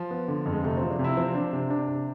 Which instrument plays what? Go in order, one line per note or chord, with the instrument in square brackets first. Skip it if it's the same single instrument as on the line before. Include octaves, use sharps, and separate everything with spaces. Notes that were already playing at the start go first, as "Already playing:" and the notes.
Already playing: [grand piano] F3
[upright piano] B3
D3
F2
[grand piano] G#3
[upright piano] C3 [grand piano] A3
[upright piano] F3 [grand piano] C4
[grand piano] D4
[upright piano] C3
[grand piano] E4
[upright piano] F3 [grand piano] C4
[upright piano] D4
C3
D4
C3